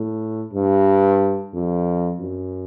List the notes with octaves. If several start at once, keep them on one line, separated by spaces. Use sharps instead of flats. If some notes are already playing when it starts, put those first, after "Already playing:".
Already playing: A2
G2
F2
F#2